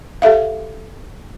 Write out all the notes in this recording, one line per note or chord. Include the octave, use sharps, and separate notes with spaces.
G4 A4 E5 F5